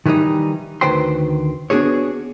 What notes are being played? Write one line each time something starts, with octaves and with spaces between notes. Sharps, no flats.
D#3 E3 G3 C#4 D#4
D2 D#3 B4 C5 G5 C6
B3 D4 F#4 G#4 C#5